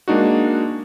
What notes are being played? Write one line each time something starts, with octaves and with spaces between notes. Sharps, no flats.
G#3 A#3 D4 D#4 F#4